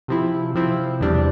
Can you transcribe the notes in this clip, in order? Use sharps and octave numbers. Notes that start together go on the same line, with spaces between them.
C3 F3 C4 E4
C3 F3 C4 E4
E2 C3 G3 D4